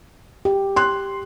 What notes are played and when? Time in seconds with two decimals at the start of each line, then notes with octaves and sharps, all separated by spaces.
0.45 G4
0.76 C6 F#6